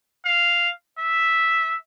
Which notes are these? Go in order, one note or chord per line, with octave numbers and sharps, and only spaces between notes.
F5
E5